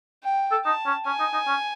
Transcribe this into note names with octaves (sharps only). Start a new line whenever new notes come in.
G5
A4
D#4 A5
C#4
C#4 G#5
D#4
D#4
C#4